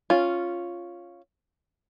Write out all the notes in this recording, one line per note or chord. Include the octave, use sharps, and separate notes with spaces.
C#4 F4